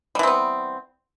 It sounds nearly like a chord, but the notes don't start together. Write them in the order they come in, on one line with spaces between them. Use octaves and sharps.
G3 E3 C4 B3